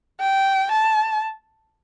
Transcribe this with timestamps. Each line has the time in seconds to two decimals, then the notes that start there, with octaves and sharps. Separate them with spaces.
0.20 G5
0.72 A5